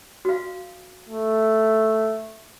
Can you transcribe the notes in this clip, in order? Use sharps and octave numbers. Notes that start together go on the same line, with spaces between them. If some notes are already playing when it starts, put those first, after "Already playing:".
F#4 F5
A3